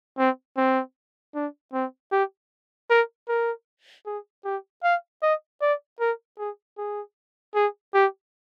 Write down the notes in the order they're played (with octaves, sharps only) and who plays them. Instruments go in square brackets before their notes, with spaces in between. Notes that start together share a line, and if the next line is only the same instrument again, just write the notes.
[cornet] C4
C4
D4
C4
G4
A#4
A#4
G#4
G4
F5
D#5
D5
A#4
G#4
G#4
G#4
G4